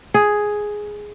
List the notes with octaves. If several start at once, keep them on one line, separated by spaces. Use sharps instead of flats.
G#4